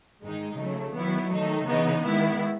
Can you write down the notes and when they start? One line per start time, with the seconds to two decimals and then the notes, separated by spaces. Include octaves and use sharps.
0.21 G#2 D#3 G#3 D#4
0.57 C#3 F#3 A3
0.94 D#3 F#3 B3 E4
1.31 D#3 A3 D#4
1.67 C#3 E3 B3 D#4
2.03 D#3 G#3 B3 E4